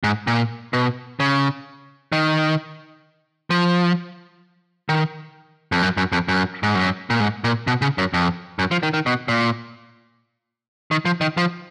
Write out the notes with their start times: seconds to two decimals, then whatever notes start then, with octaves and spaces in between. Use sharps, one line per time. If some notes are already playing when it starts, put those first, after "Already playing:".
0.04 G#2
0.27 A#2
0.73 B2
1.20 C#3
2.12 D#3
3.50 F3
4.89 D#3
5.72 F2
5.82 F#2
5.97 F#2
6.12 F2
6.28 F#2
6.63 G#2
6.75 F#2
7.10 A#2
7.20 G#2
7.44 A#2
7.67 B2
7.82 C#3
7.98 F#2
8.13 F2
8.59 F#2
8.71 F3
8.83 D#3
8.94 D#3
9.06 B2
9.28 A#2
10.91 D#3
11.05 F3
11.21 D#3
11.37 F3